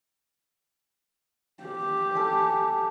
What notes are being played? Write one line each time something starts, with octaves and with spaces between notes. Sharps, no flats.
G4
A4 G#5